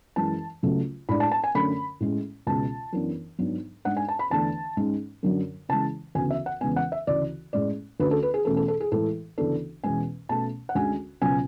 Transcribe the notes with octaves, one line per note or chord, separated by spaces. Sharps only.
F#2 E3 G#3 A5
C#2 C#3 F#3 A3
A2 G#3 D4 B5
A5
A5
G#5
F#2 D3 A3 C#4 B5
A2 G#3 C#4
C#2 B2 G#3 C#4 A5
F#2 E3 B3 D4
G#2 F#3 B3 D4
G#2 G#3 D4 F#5
G#5
A5
B5
E2 D3 A3 D4 A5
G#2 G#3 C#4
F#2 D3 F#3
C#3 E3 G#3 A5
D2 C#3 E3 B3 G#5
E5
F#5
E2 C#3 G#3 B3 G#5
F#5
E5
D2 C#3 E3 D5
A2 G#3 C#4 D5
D2 D3 A3 C#4 B4
A4
B4
G#4
E2 B2 A3 C#4 A4
A4
A4
G#4
A2 E3 G#3 A4
D2 C#3 E3 B3 D4 A4
E2 B2 G#3 C#4 G#5
B2 A3 C#4 A5
F#5
D2 D3 G#3 C#4 G#5
C#2 B2 F#3 C#4 G#5